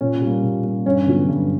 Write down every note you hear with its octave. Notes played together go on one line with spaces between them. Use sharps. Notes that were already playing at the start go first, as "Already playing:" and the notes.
A#2 C#4
G3 A#3
A#2
G3 A#3
G2 C#4
D3 F#3 B3
G2